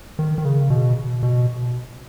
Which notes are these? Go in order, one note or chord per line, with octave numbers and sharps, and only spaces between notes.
D#3
D#3
C#3
B2
B2